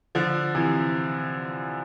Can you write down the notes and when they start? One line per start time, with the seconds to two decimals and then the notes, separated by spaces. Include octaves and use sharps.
0.15 D3 F3
0.55 C3 E3